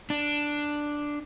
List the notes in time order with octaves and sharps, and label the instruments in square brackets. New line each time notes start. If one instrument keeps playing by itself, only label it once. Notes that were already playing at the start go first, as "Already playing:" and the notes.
[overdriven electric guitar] D4